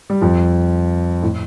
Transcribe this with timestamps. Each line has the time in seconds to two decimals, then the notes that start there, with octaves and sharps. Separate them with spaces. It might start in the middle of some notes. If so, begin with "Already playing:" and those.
0.10 G3
0.22 F2 F3
1.23 A2